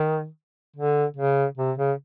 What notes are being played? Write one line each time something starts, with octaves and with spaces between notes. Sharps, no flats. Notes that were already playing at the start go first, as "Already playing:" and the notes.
Already playing: D#3
D3
C#3
C3
C#3